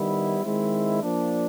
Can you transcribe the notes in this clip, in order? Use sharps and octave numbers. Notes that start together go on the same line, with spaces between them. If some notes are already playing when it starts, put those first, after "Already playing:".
Already playing: D#3 G3 B3 E4
D#3 G#3 C4 E4
F3 A#3 D4